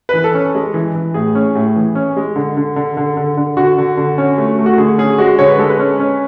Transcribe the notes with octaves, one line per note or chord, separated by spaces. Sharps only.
E3 B4
A4
C#4
G#3
E3
E3
A2 G#4
C#4
A2
E3
C#4
G#3
D3
D3
D3
D3
D3
D3
D3 F#4
D3
D3
C#4
A3
A3
F#4
D3 G#4
C#4 G#4
G#3 F#4
D3 C#5
B4
G#3 A4
B4
C#4
C#4